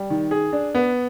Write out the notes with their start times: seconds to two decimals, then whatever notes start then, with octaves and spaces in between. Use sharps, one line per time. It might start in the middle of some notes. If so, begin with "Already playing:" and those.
Already playing: G3
0.10 D#3
0.31 G#4
0.52 D4
0.75 B3